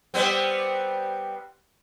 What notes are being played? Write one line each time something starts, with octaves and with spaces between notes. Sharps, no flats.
G3 B3 C4